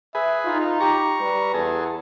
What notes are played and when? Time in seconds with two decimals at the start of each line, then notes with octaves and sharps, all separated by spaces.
0.15 G#4 B4 E5
0.45 D#4 F4
0.80 G4 A#5 C#6
1.21 G3 B4
1.54 E2 G#4 A4